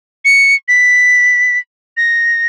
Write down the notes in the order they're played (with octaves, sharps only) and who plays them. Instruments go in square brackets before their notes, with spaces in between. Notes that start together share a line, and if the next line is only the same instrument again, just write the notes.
[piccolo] C#7
B6
A#6